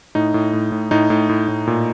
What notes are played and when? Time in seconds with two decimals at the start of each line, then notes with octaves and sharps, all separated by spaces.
0.15 A2 D#4
0.34 A2
0.53 A2
0.72 A2
0.91 A2 D#4
1.10 A2
1.29 A2
1.48 A2
1.67 A#2